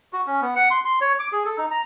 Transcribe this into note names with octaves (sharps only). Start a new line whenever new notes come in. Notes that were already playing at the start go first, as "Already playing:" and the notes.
F#4
C#4
B3
F#5
C6
C6
C#5
D6
G#4
A4
D#4
A#5